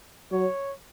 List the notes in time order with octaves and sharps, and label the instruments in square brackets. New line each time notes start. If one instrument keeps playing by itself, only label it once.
[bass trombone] F#3 [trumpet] C#5